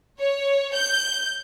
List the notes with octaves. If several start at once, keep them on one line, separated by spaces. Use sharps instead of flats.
C#5
G6